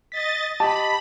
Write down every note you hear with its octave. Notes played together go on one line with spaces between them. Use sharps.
D#5 A6 B6
G4 D#5 A5 B5